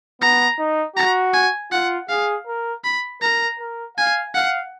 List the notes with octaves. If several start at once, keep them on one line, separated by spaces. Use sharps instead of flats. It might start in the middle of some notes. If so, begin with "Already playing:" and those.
B3 A#5
D#4
F#4 A#5
G#5
F4 F#5
G#4 F5
A#4
B5
A#4 A#5
A#4
F5 G#5
F5 F#5